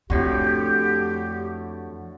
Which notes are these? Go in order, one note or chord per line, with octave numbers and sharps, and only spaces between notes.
F2 A2 D3 F#4 G4